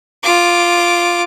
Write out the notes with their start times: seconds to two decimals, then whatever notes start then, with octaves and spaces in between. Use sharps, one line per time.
0.23 F4 D6